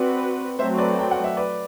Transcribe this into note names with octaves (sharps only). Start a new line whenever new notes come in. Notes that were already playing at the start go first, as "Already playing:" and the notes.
Already playing: C4 F#4 B4 D5 F#5
F#3 A3 C4 C5 E5
B4 D5
G5
F#5
E5
B4 D5